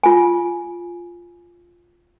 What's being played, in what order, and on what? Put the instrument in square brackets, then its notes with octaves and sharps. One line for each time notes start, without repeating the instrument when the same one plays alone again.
[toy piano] F4 G#5